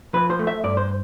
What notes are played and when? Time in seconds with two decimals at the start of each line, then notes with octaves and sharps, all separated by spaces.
0.13 F3 B4
0.30 C5
0.39 A3
0.47 E5
0.64 G2 D5
0.77 C5